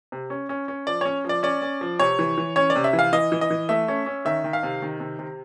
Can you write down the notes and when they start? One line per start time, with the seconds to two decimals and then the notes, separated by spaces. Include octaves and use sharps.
0.12 C3
0.30 C#4
0.49 C#4
0.68 C#4
0.87 F3 D5
1.01 C#4 C#5
1.25 F3 D5
1.43 C#4 D5
1.62 C#4
1.81 F3
1.99 C3 C#5
2.19 E3
2.38 E3
2.56 C#4 C#5
2.70 D5
2.76 C3
2.84 E5
2.93 E3
2.99 F5
3.13 E3 D#5
3.32 E3
3.41 D#5
3.51 E3
3.69 A3 E5
3.88 C#4
4.06 C#4
4.25 D#3 E5
4.44 D#3
4.53 F5
4.63 C3
4.82 D#3
5.00 C3
5.19 C3